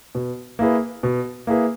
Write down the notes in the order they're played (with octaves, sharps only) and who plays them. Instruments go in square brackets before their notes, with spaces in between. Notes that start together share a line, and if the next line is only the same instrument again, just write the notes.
[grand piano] B2
A#3 E4 G#4 B4
B2
A#3 E4 G#4 B4